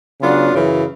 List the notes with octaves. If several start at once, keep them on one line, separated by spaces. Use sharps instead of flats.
C#3 F#3 B3 D4 F4
F#2 C#3 E3